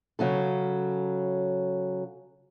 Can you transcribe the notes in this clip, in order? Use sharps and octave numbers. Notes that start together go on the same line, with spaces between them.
C#3 F#3 C#4 A4